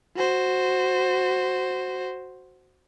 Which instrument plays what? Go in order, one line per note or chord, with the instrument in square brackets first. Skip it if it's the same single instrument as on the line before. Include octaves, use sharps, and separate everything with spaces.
[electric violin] F#4 C5